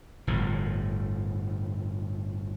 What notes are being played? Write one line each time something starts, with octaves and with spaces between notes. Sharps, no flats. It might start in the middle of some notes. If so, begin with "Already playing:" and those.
G1 A2 F3